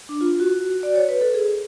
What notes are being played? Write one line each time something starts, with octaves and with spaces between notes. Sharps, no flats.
D4
F4
F#4
D5
C#5
B4
A4
G#4